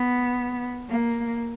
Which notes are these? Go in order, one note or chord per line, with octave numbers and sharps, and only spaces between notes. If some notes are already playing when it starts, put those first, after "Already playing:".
Already playing: B3
A#3